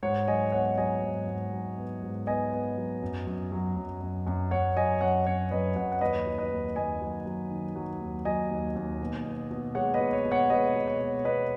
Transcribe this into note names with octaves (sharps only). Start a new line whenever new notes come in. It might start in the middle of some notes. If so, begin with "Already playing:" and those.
G#2 C#5 F#5
F#3 D#5 G#5
B3 C#5 F#5
F#3 D#5 G#5
G#2
G#2
F#3
B3
G#2
B3 D#5 G#5
B3
F#3
F#2
F#2
F#3
F#2
F#2
F#2
F#2 C#5 F#5
F#3 D#5 G#5
F#2 C#5 F#5
F#2 C#5
F#2 B4 D#5
F#2 C#5 F#5
F#5
D#2 B4 D#5
F#3
B4 D#5
D#2
D#2 D#5 G#5
F#3
F#3
D#3
F#3
D#2
F#3 D#5 G#5
D#2
D#2
B2
B2
B2
G#3 C#5 F#5
B4 D#5
B2
C#5
B2
C#5 F#5
G#3 B4 D#5
B2
C#5
B2
B2 B4 D#5